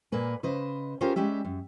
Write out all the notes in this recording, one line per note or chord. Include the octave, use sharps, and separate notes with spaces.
A#2 A#3 A#4 B4 G#5
C#3 B4 C5 D#5
C#4 F4 G4 G#4 A#4 C5
G3 G#3 C#4 G4 E5
F#2